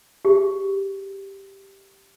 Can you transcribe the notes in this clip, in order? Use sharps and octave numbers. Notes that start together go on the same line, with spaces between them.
G4 G#4